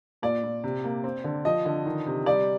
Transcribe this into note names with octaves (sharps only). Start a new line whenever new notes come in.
A#2 D5
A#2
C3
A#3
C4
D3
F3 D#5
D3
D#3
C3
G3 D5